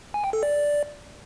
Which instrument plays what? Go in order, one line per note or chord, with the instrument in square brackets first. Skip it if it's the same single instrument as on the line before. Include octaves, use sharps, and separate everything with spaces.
[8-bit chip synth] G#5
G5
A4
D5